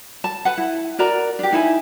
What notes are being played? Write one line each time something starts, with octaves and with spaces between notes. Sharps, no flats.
A5
B4 F#5
E4
F#4 A#4 D5 A#5
D4 G4
D#4 E4 G#5